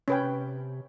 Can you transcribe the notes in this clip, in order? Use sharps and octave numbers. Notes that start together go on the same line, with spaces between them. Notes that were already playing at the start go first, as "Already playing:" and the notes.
C3 C#4 B4 G5